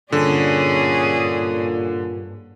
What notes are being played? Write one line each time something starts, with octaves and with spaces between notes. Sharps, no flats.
G2 A#2 D3 C#4 G#4 D5